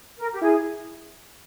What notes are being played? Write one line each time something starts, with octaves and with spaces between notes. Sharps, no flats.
A#4
G4
E4 G#4